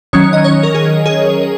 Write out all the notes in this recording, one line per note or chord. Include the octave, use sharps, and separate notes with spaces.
D#3 F#3 C#4 C#5
D#5
C#5
A#4
G#4
G#4